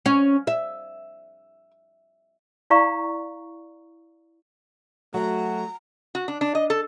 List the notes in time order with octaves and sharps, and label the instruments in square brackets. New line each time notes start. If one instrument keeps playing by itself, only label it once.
[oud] C#4
E5
[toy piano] E4 D5 F5 A#5 C#6
[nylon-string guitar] F#3 [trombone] A3 [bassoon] F#4 [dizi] A#5
[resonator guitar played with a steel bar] F#4
D4
D4
D#5
A4